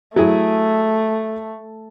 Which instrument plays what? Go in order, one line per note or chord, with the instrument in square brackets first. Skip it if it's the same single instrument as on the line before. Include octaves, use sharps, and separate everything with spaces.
[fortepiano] F#3 E4 G#4 [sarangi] A3